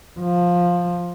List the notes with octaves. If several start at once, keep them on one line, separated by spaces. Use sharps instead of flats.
F3